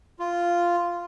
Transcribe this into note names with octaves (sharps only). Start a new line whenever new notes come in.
F4